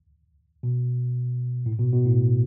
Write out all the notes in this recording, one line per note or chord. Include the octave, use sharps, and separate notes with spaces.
B2
A2
B2
B2
A2